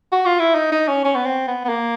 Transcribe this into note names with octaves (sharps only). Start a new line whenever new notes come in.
F#4
F4
E4
D#4
D#4
C#4
C#4
B3
C4
B3
B3
A#3